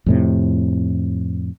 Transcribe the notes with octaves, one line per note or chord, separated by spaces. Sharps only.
F2 A2 C3